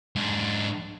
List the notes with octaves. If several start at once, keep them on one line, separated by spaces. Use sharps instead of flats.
G#2 D4